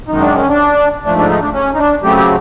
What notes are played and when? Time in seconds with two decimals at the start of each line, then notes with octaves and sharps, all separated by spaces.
0.08 F#2 D#3 G#3 D#4
0.21 D4
0.35 C#4
0.49 D4
1.05 G#2 F3 A3 D4
1.18 D4
1.30 D#4
1.41 D4
1.54 C#4
1.75 D#4
1.78 D4
2.02 C#3 F#3 A3 C4 G4
2.17 G4